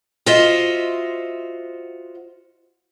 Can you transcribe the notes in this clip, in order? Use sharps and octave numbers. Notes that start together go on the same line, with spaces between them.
F4 F#4 C5 D#5 E5